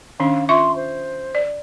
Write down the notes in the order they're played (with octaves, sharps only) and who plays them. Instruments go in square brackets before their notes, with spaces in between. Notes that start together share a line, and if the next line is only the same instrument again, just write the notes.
[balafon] D#3 C#4 D4 [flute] F5
[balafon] F4 E5 C#6 [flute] C6
[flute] C5
[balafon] D5